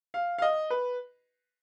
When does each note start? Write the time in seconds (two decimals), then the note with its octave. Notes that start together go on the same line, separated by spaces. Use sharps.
0.14 F5
0.38 F5
0.42 D#5
0.70 B4